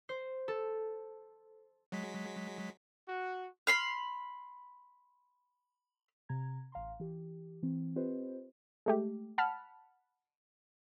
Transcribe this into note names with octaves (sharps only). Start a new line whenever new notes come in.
C5
A4
F#3 G#3 B6
F#4
B5 C6 F6
C3 A#5 G#6
A1 F5 A#5 C6
E3 G4
E3 C4
C4 F4 G4 B4 C5 D#5
G#3 A3 G4
F#5 A5 B5 F6